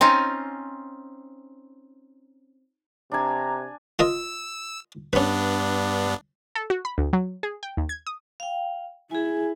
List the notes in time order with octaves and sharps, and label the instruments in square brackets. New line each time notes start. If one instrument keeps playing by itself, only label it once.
[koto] C4 C#4 D#4 F4
[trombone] C3 [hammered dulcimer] D4 G#5 [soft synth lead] A#5
[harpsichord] F4 A#4 D#5 [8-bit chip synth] E6
[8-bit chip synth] G2 B3 D4 [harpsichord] C#4 B4
[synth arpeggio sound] A4
F#4
B5
D2
F#3
G#4
G5
D#2
G#6
D#6
[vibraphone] F5 G5
[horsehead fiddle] E4 [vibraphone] G#4 G#5